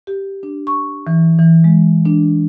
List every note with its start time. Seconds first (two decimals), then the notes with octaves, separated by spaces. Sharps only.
0.07 G4
0.43 D4
0.67 C#6
1.07 E3
1.39 E3
1.64 G#3
2.05 D4